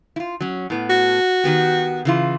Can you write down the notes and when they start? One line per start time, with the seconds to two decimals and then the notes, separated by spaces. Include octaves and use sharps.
0.16 E4 F4
0.41 F#3 C#4
0.70 A2 B3
0.90 F#4
1.44 D#3 B3 G4
2.05 C#3 E3 F4